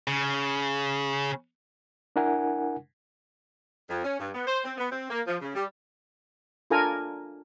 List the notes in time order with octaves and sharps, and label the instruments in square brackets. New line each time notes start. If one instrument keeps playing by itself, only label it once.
[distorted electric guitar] C#3
[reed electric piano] D4 E4 A#4 F#5 G#5
[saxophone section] F2
C#4
G2
B3
C5
C4
B3
C4
A#3
F3
C#3
G3
[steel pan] D4 F4 A4 A#4 G#5 A#5